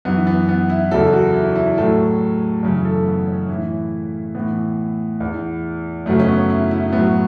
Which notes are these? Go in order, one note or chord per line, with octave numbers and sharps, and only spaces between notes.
F#2 E3 B3
B3
B3
E4
E2 C#3 F#3 A4
F#4
E4
E4
A2 F#3 A4
F#2 C#3 E3
A4
B3
C#4
A2 E3 E4
A2 E3 B3
E2 E3
F#2 C#3 F#3 A3
C#4
B3
E4
E4
A2 F#3 B3